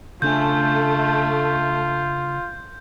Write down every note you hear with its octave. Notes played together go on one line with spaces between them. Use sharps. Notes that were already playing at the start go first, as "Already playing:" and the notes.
C#3 A3 D4 F4 G#5 G6